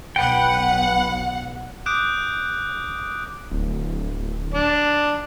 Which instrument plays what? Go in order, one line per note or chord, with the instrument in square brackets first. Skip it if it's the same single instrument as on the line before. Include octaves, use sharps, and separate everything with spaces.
[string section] B1 F#5 [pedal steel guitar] B4 G5
[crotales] D6 D#6 F#6 G6 D7
[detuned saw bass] D1
[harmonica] D4